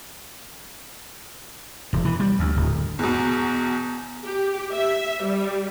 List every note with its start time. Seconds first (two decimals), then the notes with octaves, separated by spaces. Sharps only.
1.93 E1
2.05 E3
2.20 G3
2.39 D2
2.56 D1
2.99 E2 B2
4.24 G4
4.74 E5
5.24 G3